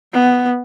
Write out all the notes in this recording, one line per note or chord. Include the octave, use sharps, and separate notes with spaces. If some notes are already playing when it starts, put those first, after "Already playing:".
B3